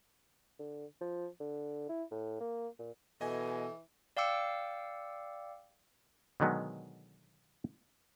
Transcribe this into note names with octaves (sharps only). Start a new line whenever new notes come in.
D3
F3
D3
E4
A2
A#3
A#2
B2 E3 A4 D#5 G#5
D5 F5 G5 D6 E6 C#7
B2 D3 D#3 F#3 G#3 B3